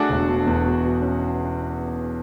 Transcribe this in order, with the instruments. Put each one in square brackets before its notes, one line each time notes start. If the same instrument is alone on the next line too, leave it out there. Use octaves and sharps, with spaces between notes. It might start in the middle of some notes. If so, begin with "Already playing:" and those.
Already playing: [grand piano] A3 [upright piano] D4 F#4 G#4 A4
[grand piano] E1
B2
E2
B2
B2
C#4